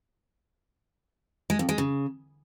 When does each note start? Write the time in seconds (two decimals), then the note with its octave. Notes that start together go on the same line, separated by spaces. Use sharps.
1.50 G#3
1.59 F2
1.69 G#3
1.78 C#3